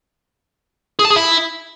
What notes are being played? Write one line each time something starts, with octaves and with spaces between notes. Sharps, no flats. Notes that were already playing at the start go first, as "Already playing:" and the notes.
G#4
A5
G#4
E4